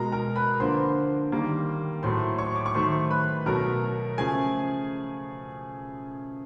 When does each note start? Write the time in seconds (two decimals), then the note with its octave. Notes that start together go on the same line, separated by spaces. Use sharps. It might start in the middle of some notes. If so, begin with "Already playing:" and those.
Already playing: B2 G#3 A#4 A#5
0.12 A#4 A#5
0.36 B4 B5
0.60 D3 F3 A#3 C5 C6
1.32 D#3 G3 A#3
2.03 A2 F#3 A3 C5 C6
2.38 C#5 C#6
2.56 D6
2.66 C#6
2.74 D#3 F#3 A3 C5 C6
3.10 B4 B5
3.46 B2 F#3 A3 A#4 A#5
4.18 C#3 F3 A3 G#4 G#5